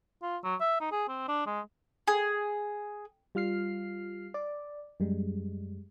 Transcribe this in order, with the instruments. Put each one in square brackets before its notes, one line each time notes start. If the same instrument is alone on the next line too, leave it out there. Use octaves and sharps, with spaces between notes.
[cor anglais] F4
F#3
E5
D#4
G#4
C4
D4
G#3
[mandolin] G#4
[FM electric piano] G3 F4 F6 C7
D5
F#2 G3 G#3